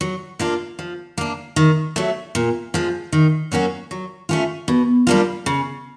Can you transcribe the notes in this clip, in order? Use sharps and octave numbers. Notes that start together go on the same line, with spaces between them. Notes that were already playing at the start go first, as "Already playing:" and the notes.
F#3
A#3 D4 F4
F3
A#3 D4
D#3
F#3 A3
A#2
F3 G#3
D#3
F#3 A#3 C#4 F#4
F#3
A3 C#4 F4
B2
G3 A#3 D4 F4
C#3